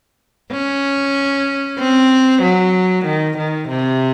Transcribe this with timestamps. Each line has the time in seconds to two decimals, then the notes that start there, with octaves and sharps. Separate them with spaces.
0.52 C#4
1.79 C4
2.43 F#3
3.06 D#3
3.38 D#3
3.69 C3